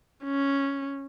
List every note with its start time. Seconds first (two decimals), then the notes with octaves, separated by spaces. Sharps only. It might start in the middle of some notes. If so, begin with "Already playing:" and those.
0.25 C#4